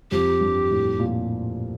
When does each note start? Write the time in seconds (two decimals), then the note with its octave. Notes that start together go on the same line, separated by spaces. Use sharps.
0.11 F2 F3 G4
0.41 G2 G3
0.71 A2
0.99 A#2